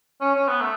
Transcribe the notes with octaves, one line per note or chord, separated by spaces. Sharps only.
C#4
C#4
B3
A3